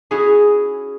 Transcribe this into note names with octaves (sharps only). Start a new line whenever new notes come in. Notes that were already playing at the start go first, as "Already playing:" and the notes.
C#4 E4 F#4 G#4